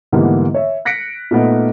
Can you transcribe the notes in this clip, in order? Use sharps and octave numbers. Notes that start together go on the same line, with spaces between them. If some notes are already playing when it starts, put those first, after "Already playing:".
G#2 D3 E3 G3 A#3 B3
C#5 E5
F#6 A#6 B6 C#7 D7
A#2 A3 B3 D#4